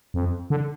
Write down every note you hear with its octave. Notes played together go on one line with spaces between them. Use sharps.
F2
D3